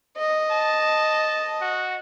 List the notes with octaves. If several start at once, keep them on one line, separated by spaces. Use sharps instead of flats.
D#5
A5
F#4